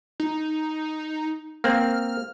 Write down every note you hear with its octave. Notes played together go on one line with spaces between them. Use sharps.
D#4
A#3 C4 F6